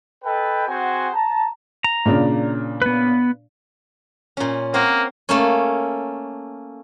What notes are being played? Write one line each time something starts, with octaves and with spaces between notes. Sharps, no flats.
A4 B4 D#5 G5
C4 F#4 G#4 C5 F#5 G#5
A5 A#5
A#5
A#2 C#3 D4
B3 B4
A#2 C#4
A#3 C4 C#5 F#5
A3 A#3 C#4